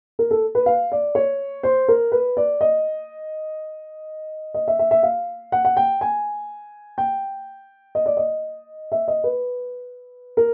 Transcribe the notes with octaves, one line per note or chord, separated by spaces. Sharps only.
A#4
A4
B4
F5
D5
C#5
C5
A#4
B4
D5
D#5
D#5
E5
E5
E5
F5
F#5
F#5
G5
G#5
G5
D#5
D5
D#5
E5
D#5
B4
A#4